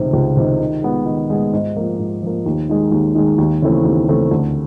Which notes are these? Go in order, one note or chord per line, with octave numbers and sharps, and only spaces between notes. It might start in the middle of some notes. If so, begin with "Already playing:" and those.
Already playing: C#2 C3 D#3
C#2
C3 D#3
D#3
G#3 B3
D#3
G#3 B3
G#2
F3 A#3
G#2
F3 A#3
D#2
D#3 G#3
D#2
D#3 G#3
D#2
C#3 E3 A3 C4
D#2
C#3 E3 A3 C4
D2